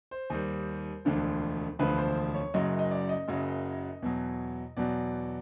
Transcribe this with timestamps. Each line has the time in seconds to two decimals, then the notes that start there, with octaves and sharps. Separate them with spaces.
0.11 C5
0.30 D#2 D#3 G3
1.05 E1 D2 D3 F3
1.79 E1 D2 D3 F3 B4
1.98 C5
2.34 C#5
2.54 F#1 F#2 C#3 F#3 D#5
2.79 D#5
2.91 D5
3.09 D#5
3.28 F#1 F#2 C#3 F#3
4.02 E2 B2 F#3
4.77 E2 B2 F#3 D5